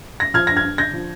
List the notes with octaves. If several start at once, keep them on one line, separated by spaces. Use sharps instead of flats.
A#6
F3 F6 G#6
G2 A#6
F6 G#6
G2
D3 G6 A#6
F3